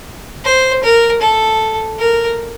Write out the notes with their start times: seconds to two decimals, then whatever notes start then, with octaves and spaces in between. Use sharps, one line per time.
0.45 C5
0.83 A#4
1.21 A4
1.99 A#4